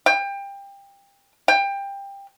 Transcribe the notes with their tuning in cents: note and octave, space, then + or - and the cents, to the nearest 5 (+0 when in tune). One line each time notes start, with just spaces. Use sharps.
G5 +25
G5 +20